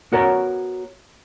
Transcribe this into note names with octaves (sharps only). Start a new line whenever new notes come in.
B3 F#4 A#4 C#5 A#5